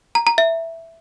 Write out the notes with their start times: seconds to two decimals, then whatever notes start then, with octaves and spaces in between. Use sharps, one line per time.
0.15 A#5
0.27 A#5
0.38 E5